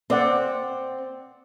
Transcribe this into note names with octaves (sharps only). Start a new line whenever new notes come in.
C4 C5 D5 F#5